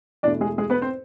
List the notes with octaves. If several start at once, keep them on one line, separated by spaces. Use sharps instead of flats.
E2 B2 A3 D4 D5
G#3 G#4
G#3 G#4
B3 B4
C4 C5